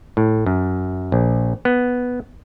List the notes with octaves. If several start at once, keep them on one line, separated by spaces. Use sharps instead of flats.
A2
F#2
A#1
B3